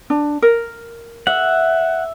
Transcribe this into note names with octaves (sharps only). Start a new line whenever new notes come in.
D4
A#4
E5 F#5